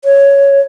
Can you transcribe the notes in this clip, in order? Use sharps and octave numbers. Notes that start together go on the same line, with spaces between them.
C#5